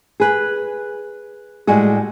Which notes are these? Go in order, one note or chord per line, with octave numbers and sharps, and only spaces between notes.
G#4 B4
A2 G3 G#3 F#4 G#4